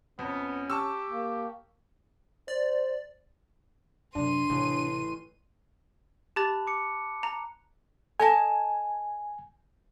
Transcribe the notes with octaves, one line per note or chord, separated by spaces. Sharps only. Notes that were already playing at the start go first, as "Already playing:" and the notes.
F2 B3 C#4
G4 A5 C#6 E6
A#3
C5 D5
F#2 C3 D4 C6 D#7
A1 C3
G4 A5 B5 F#6 A6
D6 C#7
A#5
A4 D#5 G#5 A5